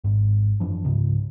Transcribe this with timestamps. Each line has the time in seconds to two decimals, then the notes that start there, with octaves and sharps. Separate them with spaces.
0.04 G#1 G#2
0.60 F#2 E3 F3 D4
0.85 C#2 G#2 C#3